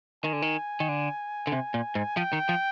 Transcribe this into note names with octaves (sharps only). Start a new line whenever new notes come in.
D#3 G#5
D3
D#3
D#3
D3
D3
C3
A#2
G#2
F3 G5
D#3
F3